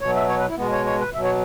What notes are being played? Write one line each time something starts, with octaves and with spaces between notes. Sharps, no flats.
B2 F#3 C#5
E5
C#5
B4
E4
B2 G#3 B3
C#5
C#5
B4
B2 F#3 E5
C#5